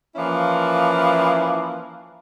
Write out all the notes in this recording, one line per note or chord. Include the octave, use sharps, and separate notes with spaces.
E3 F3 A#3 C#4 E4